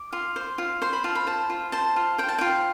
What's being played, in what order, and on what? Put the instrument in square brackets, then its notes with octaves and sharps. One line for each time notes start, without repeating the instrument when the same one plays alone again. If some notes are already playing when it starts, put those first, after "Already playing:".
Already playing: [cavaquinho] D6
F4
C5
F4
C5 C6
B5
F4 A5
B5
C5 A5
F4
C5 A5
F4
C5 G5
A5
F4 G5